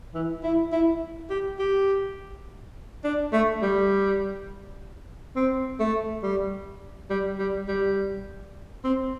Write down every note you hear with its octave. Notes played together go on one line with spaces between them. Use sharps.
E3
E4
E4
G4
G4
D4
A3
G3
C4
A3
G3
G3
G3
G3
C4